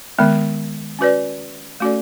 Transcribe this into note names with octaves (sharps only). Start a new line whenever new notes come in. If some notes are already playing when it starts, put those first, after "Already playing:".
D#3 G#3 B3
C#4 F#4 B4 D5
A3 C#4 F#4 A4 D5